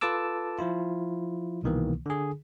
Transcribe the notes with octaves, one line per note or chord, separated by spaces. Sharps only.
F4 A4 B4 A5 D6 E6
F3 E4 F4
C2 B2 D#3 E3 A#3
D3 G#4